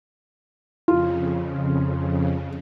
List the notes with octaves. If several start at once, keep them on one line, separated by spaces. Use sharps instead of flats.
F2 C#3 F4